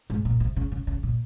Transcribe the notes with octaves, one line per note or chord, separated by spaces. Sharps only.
G#2
A#2
C3
C#3
C#3
C#3
A#2